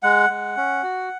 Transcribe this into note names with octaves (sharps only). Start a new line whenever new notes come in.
G#3 F#5
G#3
C#4
F#4